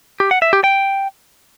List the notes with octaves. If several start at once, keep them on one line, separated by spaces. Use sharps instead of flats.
G4
F#5
E5
G4
G5